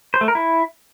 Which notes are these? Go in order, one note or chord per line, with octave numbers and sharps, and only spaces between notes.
C5
A3
A#4
E4